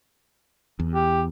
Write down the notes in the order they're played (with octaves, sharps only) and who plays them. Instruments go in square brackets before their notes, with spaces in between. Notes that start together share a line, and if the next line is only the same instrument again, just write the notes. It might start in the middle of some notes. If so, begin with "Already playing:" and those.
[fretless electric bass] E2
[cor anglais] G4